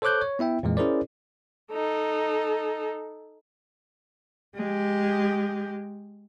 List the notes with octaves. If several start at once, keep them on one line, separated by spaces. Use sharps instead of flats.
A4 C5 C#5 D6 F#6 G6
C#5
B3 E4 E5 G5
F2 A#2 E3 G#3
C#4 E4 G#4 A#4 C5 D5
D#4 A4
G#3 G4